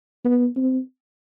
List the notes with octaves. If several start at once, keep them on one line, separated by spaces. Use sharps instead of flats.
B3
C4